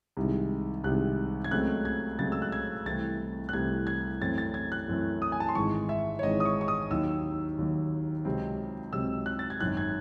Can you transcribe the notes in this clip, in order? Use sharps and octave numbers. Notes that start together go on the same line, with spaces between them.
C2 C3 D#3 G#3
C2 C3 D#3 G#3 F#6
G#6
C#2 C#3 F#3 A3 C4 F#6
G#6
C#2 C#3 F#3 A3 C4 A6
E6
F#6
G#6
C2 C3 E3 A3 C4 A6
F#6
C2 C3 E3 A3 C4 G#6
G#6
F#2 E3 A3 C4 A6
A6
G#6
F#6
F#2 E3 A3 C4
D#6
G#5
A5
C6
G#1 G#2 E3 G#3 C#6
E5
C#5
G#1 G#2 E3 G#3 D#5
D#6
C#6
C#6
D#6
D#2 D#3 F#3 E6
D#2 D#3 F#3
C#2 C3 F#3 C4
C#2 C3 F#3 C4 E6
F#6
A6
G#6
G#1 F#2 D#3 F#6
G#6